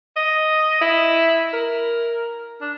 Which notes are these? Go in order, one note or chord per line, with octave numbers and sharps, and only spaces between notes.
D#5
E4
A#4
D4